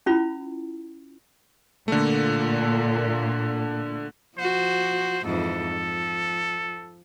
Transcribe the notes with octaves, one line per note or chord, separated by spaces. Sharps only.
C#4 E4 F4 B5
A#2 D3 A3
F3 F#4 C5
F2 G#2 E3 A4
F3